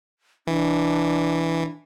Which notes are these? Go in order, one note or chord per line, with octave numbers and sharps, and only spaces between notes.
E3 D4